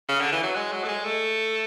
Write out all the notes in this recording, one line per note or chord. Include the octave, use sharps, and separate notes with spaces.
C#3
D3
E3
F#3
G#3
F#3
A3
G#3
A3